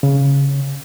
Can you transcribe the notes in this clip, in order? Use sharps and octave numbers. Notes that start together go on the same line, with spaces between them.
C#3